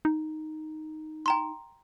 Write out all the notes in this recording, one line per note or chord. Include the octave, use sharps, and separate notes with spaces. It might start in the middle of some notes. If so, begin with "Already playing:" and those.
D#4
G5 A#5 C6